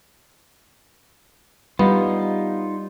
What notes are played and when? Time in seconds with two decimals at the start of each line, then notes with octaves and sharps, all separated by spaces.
1.79 G3 B3 D#4 F4